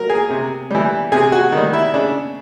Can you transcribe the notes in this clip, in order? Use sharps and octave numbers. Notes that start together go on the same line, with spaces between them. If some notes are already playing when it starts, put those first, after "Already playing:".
Already playing: F#3 A#4
G#4
C3
E3 G3
C3 G#4
F#4
D#3
G3
E4
C#3 D4